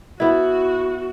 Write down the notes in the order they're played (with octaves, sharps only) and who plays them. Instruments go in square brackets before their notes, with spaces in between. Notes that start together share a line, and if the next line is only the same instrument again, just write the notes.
[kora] B3 E4 [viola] F#4